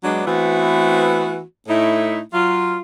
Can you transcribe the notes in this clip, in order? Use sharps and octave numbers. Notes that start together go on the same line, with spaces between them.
F#3 G#3 B3 D4
E3 A3 B3 C4 F#4
A2 A3 D#4 E4
F#3 F4